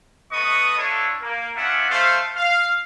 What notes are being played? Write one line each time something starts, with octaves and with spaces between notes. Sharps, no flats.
A3 B3 B4 D#5 C#6 D#6
D4 E4 F4 A4 C#5
A#3
C#4 D4 F4 E5 F#5
A3 C5 F5
F5